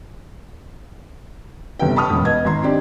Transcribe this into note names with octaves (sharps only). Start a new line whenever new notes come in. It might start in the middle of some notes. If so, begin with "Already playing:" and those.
G1 C3 B3 G5
A5 B5 C#6 D#6 F6
E1 F#2
B3 D#5 G#6
G#1 A#5 C6
C4 D4 D#4 G4 D5